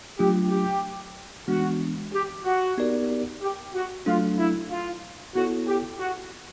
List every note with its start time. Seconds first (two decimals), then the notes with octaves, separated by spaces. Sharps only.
0.19 F#3 A3 D4 F4 G4
0.51 G4
1.48 E3 G#3 B3 D4 F#4
2.13 G4
2.45 F#4
2.78 B3 D#4 G4 A#4 D5
3.41 G4
3.74 F#4
4.06 F#3 A3 D4 F4 F#4 A4
4.38 E4
4.71 F4
5.35 B3 E4 F#4 A4 C#5
5.67 G4
6.00 F#4